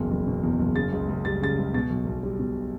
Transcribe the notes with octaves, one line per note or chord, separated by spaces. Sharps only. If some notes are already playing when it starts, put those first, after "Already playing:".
Already playing: F#1 B1 E2
F#1
B2
E2
F#1
C#3 A6
C#2
C#2
G3 A6
C#3 A6
C#2
B2 A6
B1
B1
G3
B2